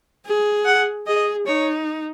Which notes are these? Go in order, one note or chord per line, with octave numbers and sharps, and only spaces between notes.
G#4
F#5
G#4 D#5
D#4 C#5